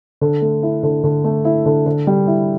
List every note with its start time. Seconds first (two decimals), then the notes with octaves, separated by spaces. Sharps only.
0.21 D3
0.42 A3
0.63 E4
0.83 D3
1.04 D3
1.24 A3
1.45 E4
1.66 D3
1.86 D3
2.07 G3
2.27 E4